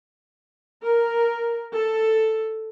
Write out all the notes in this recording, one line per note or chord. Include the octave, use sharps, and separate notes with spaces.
A#4
A4